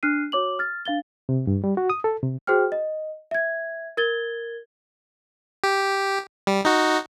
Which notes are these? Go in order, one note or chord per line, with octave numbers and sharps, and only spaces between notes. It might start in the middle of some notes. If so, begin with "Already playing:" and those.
D4 F6 F#6 C7 D#7
F#4 C#5 D6 F#7
F6 A6
D4 F5 A6 G7
C3
G2
G3
F#4
D#6
A4
C3
F#4 G#4 C5 G5 F6
D#5
E5 G#6
A#4 G#6 A6 G7
G4
G3
D#4 F#4